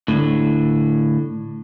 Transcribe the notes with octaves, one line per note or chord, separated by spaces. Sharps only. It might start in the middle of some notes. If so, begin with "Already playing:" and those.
A2 D3